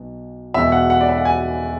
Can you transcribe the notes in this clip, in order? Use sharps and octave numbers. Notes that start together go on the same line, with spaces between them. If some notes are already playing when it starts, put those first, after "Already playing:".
Already playing: B1 B2
E1 E2 B2 E5
F#5
F#5
D5
E5
F#5
G#5